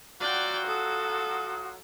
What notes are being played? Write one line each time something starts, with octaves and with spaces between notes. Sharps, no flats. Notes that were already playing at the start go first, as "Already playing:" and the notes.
F#3 F4 F#4 D5 G5
A4 D#6